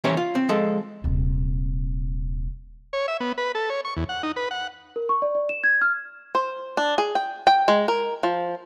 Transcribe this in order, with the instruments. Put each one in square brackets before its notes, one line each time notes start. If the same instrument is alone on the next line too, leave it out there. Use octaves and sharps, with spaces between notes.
[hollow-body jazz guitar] E3 A#3 C#4 G4 C5 C#5
F4
C4
F3 G#3 A4
[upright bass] D#1 C3
[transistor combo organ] C#5
E5
B3
B4
A4
C#5
C#6
E2
F#5
D#4
B4
F#5
[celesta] A#4
C#6
D5
D5
E7
G#6
F6
[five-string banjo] C5
D4
G#4
G5
G5
G#3
A#4
F3